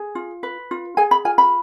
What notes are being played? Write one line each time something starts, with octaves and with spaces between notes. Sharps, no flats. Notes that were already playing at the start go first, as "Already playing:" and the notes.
Already playing: G#4
F4
B4
F4
G#4 G#5
B5
F4 G#5
B5